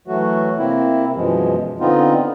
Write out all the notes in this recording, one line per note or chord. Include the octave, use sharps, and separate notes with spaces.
E3 F#3 A3 F#4
C3 A#3 C4 E4
F#2 B2 E3 F3 G#3
D3 B3 C4 D#4 F4